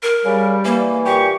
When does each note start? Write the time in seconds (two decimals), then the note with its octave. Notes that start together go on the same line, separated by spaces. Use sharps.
0.03 A#4
0.25 C#3 G3
0.65 E3 A#3
1.05 A#2 G4 G5 C#6